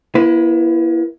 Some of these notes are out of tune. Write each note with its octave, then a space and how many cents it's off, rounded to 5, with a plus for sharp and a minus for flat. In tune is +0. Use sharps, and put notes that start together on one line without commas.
A#3 +45 E4 +15 B4 +15